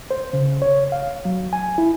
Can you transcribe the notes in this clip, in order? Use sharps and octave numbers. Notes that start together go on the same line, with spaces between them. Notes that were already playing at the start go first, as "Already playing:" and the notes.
C5
C#3
C#5
F5
F#3
G#5
E4